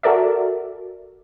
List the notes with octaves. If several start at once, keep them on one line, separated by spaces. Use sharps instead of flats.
F#4 A4 A#4 D5 E5